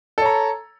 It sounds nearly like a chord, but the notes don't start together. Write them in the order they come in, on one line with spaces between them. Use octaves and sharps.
A4 C#5 A#5